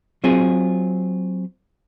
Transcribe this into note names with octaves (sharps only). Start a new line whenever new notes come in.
F#3 C4 F4 G#4